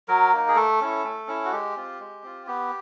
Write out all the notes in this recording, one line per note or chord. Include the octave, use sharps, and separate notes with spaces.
F#3 A#4
A#3 D#4
G#4
A3 A4
C#4 E4
A3
C#4 E4
F#4
G#3 G4
C4 F4
G#3
C4 F4
B3 G4